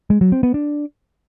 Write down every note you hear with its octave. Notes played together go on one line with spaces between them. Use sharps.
G#3
F#3
C4
B3
D4